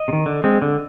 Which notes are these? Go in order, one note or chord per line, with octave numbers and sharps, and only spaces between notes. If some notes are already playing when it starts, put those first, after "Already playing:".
Already playing: D#5
C3
D#3
D3
G#3 C4
D3